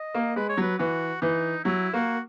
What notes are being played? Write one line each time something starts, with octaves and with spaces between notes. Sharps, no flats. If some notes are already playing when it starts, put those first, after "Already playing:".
Already playing: D#5
A#3
G#3 B4
C#5
F#3 B4
E3 F#4
E3 D#4
F#3 E4
A#3 F#4